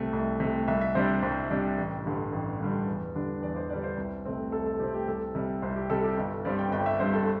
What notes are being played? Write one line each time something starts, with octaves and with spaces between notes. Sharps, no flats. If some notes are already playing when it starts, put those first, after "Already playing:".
Already playing: C2 C3 A3
C2
C3 A3
C2 E5
E5
C3 G3 D4 C5
C2 C5
C3 G3 D4
A1
G2 D3 G3
A1
G2 D3 G3
E2
D3 G3 D4
E2 D5
C5
D3 G3 D4 D5
C5
C2
C3 A3 C4
C2 A4
A4
C3 A3 C4 G4
G4
C2 A4
C3 G3
C2 C5
G4
C3 G3 A4
G4
G1
G2 G3 C4 D5
G5
G1 G5
E5
G2 G3 C4 C5
A4